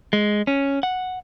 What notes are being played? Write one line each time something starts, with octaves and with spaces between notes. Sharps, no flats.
G#3
C#4
F#5